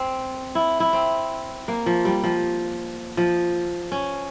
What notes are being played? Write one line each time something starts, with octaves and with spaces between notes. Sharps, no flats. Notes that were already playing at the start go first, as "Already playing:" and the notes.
Already playing: C4
E4
E4
C4
A#3
F3
G3
F3
F3
C#4